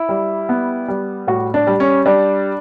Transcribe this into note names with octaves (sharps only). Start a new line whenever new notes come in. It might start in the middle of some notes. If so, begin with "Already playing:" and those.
Already playing: E4
G3
B3
G3
A2 F#4
D4
G3
C#4
G3 D4